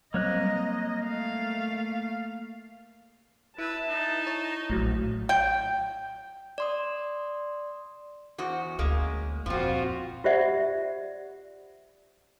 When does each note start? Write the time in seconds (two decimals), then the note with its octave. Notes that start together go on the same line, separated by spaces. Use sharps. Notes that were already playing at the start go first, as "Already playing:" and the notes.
0.14 F#3 G3 A#3 C4 C#5 D#5 F#6
1.02 A3 F5
3.58 E4 B4 A5
3.88 D#4
4.27 C#5
4.70 A#1 A2 F#3
5.29 G5
6.58 D5 C6 D#6
8.38 E2 F#4 C5
8.79 D2 G#3 A#3 C#4
9.46 F2 A#2 F3 G3 C4 F4 F#4
10.24 F4 G4 C5 D5 E5 F#5